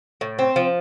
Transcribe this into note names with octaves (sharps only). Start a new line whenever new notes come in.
A2
C4
F3